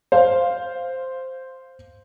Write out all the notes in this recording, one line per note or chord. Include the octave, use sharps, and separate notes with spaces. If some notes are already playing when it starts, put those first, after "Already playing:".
C5 F5